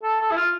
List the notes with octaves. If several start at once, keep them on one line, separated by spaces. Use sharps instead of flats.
A4
A4
E4
F4